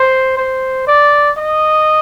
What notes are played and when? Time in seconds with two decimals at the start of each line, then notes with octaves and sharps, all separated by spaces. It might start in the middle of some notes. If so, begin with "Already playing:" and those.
Already playing: C5
0.37 C5
0.87 D5
1.37 D#5